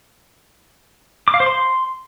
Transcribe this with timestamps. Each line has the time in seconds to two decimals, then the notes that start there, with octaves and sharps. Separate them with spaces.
1.28 D6
1.34 F5
1.40 C5
1.46 C6